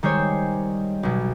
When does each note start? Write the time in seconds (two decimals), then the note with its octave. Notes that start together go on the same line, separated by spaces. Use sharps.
0.03 D#3 G3 G#3 C5 C#5
1.03 B1 B2